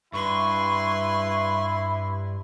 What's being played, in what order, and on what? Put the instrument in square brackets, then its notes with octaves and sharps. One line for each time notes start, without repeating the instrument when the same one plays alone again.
[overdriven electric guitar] G2 [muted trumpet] E4 [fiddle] B4 C6 [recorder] C#6